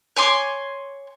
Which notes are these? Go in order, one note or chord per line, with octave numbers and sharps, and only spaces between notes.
C#5 G#5 C6 D6